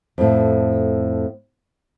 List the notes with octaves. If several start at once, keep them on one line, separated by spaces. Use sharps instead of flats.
F2 A2